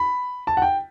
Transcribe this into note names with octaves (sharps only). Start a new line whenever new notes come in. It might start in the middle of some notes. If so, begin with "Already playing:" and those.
Already playing: B5
A5
F#5
G5